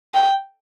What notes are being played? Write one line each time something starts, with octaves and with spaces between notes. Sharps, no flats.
G5